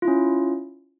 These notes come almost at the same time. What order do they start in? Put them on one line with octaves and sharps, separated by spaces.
F4 E4 C#4